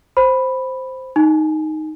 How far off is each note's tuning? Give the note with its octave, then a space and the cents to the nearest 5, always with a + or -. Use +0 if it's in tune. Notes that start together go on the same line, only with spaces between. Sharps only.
C5 +0 B5 +0
D#4 +0 G#5 +10